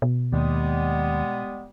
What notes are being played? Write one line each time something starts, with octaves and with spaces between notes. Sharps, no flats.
B2
D#2 G3 G#3 B3